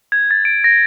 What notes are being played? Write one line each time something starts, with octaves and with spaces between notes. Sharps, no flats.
G#6
A6
D7
A#6